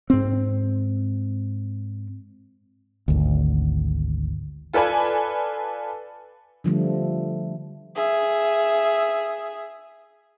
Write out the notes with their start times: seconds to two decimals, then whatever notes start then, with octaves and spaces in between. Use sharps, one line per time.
0.10 G#2 C4
3.08 G#1 D2
4.73 F4 A4 B4 D5 G#5 B5
6.64 D3 F3 G3 A3
7.96 G#4 E5